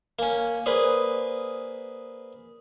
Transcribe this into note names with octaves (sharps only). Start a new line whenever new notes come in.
A#3 C#4 F5 G#5
A#3 G#4 B4 C5 D5 D#6